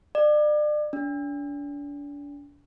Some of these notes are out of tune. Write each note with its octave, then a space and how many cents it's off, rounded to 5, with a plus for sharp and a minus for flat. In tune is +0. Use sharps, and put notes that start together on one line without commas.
D5 +35
D4 -35